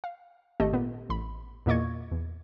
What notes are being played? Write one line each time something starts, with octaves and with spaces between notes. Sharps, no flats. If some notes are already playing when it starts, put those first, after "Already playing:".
F5
G#1 A3 G4 A4 D#5
A#2 B3
A1 B5
E2 A#2 A#3 D#5 C#6 G#6
E2